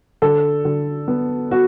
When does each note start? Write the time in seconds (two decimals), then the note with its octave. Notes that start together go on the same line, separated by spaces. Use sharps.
0.22 D3 A4
0.65 D3
1.08 B3
1.51 B3 F#4